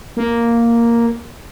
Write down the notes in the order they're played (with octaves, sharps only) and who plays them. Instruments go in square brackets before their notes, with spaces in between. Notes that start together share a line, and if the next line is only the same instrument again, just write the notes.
[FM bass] A#3